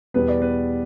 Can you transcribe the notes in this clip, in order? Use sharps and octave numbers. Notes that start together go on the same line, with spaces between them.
E2 B2 G3 B3 B4
D5
B3 B4